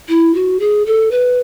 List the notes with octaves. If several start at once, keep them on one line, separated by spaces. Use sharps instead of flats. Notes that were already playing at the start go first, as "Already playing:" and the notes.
E4
F#4
G#4
A4
B4